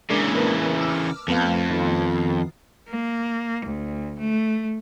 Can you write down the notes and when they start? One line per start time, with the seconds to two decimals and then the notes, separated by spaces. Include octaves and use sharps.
0.10 C#3 E3 G#3 A#3 D4
0.35 A#4 B4 A5
0.81 D6 E6 F6
1.28 F2 A3 B3 F5
1.70 D#3 B3 F4
2.89 A#3
3.66 D2
4.20 A3